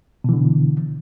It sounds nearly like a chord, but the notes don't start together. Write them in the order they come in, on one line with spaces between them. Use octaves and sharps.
B2 E3 D3